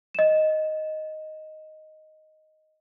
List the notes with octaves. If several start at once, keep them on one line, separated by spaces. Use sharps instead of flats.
D#5 E7